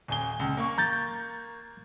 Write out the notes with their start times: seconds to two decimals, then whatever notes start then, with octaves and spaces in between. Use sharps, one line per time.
0.08 D#1 G#5 G7
0.39 C#2
0.57 A#3 C#6
0.78 A#5 G6 A6